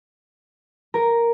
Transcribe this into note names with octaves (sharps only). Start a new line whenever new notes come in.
A#4